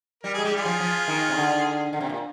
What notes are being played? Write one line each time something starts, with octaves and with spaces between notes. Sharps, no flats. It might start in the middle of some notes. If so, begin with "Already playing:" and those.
G3 A#4
G#3 G#4
G#3 G4
G3 F4 G#4
F3
F3
D#3
C3
D3
D3
C3
A#2